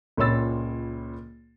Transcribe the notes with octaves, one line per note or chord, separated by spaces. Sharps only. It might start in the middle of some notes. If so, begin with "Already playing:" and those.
C#2 A#2 C#5 B5 E6 A6